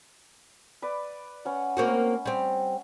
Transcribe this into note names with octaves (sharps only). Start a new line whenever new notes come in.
B4 D5
C#4 B4 F#5
A#3 C4 F#4
G3 C4